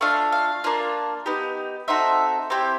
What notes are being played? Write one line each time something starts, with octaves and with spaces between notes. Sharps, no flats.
A3 D4 F4 F5
F5
A#3 D4 F4
B3 D#4 G4
C4 D#4 F#4 A4 E5
C4 E4 G4